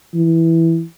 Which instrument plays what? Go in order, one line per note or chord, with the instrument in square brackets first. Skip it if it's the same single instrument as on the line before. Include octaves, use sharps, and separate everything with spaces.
[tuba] E3